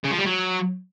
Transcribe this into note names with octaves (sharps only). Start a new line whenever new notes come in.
C#3
F3
G3
F#3